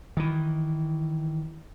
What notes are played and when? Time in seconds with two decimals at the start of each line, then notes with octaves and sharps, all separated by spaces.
0.17 D#3 E3